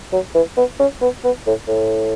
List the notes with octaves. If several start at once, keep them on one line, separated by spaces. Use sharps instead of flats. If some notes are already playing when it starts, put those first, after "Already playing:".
F#3
E3
B3
C#4
B3
B3
A2
A2